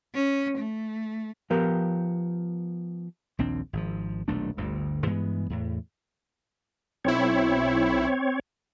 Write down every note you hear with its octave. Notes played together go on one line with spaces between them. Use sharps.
C#4
A3
F3 B3 G4 A#4
A#1 D#2 C4 D4
G#1 F3
D#1 B1 A3 D4
G1 D2 G2
G2 E3 G#3 B3
E2 A2
B1 C4 E4 C#5